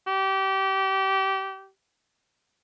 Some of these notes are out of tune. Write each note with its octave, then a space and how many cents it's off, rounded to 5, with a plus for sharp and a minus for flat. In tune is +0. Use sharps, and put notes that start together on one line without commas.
G4 -25